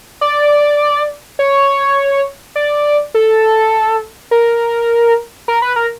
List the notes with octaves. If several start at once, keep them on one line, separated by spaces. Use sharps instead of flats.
D5
C#5
D5
A4
A#4
A#4
B4
A#4